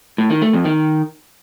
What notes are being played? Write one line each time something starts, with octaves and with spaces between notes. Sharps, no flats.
A2
D#3
A3
F2
D#3